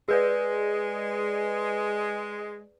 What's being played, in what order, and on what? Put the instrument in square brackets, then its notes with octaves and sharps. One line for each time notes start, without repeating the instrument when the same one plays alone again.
[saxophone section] G#3 [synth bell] G#4 B4 D5